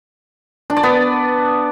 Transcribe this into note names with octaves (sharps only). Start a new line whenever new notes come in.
D4
D5
B3